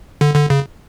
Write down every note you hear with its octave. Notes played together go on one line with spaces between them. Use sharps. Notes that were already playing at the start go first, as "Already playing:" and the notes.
D3
D3
C#3